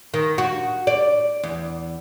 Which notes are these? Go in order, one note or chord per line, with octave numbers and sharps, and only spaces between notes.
D#3
F#4
D5
E2